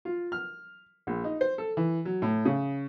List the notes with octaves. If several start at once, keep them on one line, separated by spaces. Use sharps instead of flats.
F4
F6
A#1
D#4
C5
A4
E3
F#3
A2
C#3